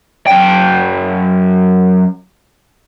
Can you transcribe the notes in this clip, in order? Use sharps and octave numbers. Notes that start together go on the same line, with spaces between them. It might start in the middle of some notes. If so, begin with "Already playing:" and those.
F#2 G5